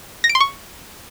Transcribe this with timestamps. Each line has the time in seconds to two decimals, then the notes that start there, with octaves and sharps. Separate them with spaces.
0.24 A#6
0.29 D7
0.35 C6
0.40 C#6